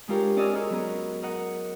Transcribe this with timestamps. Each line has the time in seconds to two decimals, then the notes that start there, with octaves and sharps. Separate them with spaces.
0.08 G#3 D4 F4 G4 A#4 C#5
0.36 C#4 D5 D#5 G#5 E6 F6
0.55 C#4 F#4 G#4 A#4
0.70 F#3 B3 A#4
1.23 A#4 D#5 F#5